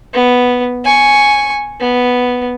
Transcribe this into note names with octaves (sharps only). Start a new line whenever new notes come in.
B3
G#5 C#6
B3